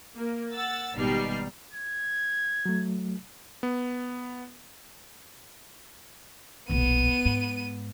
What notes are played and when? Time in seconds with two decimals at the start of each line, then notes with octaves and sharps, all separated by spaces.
0.18 A#3
0.52 F#5 E6 A6
0.97 G#1 B2 G3 D#4 F6 C7
1.73 G#6
2.66 F#3 A3
3.63 B3
6.70 D#1 B1 B3 D#7
7.26 G#2